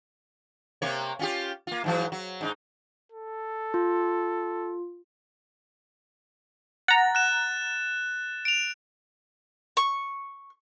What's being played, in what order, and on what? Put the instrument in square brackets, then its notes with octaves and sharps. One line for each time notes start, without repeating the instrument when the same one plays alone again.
[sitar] C3 A#3 C#5
C#4 F4 G4
A#3 F4
G#2 E3 F#3
F#3
G#2 C#4 D#4
[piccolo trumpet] A4
[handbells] F4
[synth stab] F#5 A#5 [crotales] A6
[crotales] F#6 E7
D7 F7
[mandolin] C#6